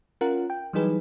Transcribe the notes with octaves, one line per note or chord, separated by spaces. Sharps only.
C#4 F4 A#4 F#5
G5
E3 F#3 G3 D#4 G#4 B4